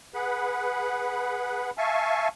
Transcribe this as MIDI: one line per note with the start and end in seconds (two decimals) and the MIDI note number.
0.14 1.71 68
0.14 1.71 71
0.14 1.71 78
0.14 1.71 83
1.78 2.28 76
1.78 2.28 77
1.78 2.28 80
1.78 2.28 81
1.78 2.28 85